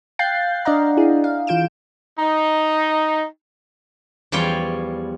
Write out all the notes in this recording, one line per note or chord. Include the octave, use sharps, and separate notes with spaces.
F5 G5 F#6 G6 A6 C7
D4 D5 D#5 F5 F#5 A#5
E4 G#4
F5
E3 F4 G6 D7 E7
D#4
E2 F3 G3 F4 C#5 G5